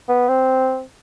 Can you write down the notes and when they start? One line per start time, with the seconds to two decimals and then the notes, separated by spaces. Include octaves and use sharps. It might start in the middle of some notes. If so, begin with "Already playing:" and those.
0.09 B3
0.28 C4